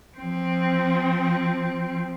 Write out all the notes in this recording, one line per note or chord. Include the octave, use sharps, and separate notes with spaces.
F3 C4